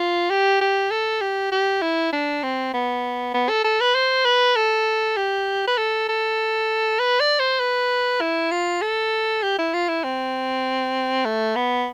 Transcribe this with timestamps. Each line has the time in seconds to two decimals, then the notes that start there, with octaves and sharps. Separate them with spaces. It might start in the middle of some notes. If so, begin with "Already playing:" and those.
Already playing: F4
0.30 G4
0.61 G4
0.91 A4
1.21 G4
1.52 G4
1.82 E4
2.13 D4
2.43 C4
2.73 B3
3.34 B3
3.49 A4
3.65 A4
3.81 B4
3.95 C5
4.25 B4
4.56 A4
5.17 G4
5.68 B4
5.78 A4
6.09 A4
6.99 B4
7.20 D5
7.40 C5
7.60 B4
8.21 E4
8.51 F4
8.82 A4
9.43 G4
9.59 E4
9.74 F4
9.88 E4
10.04 C4
11.25 A3
11.56 B3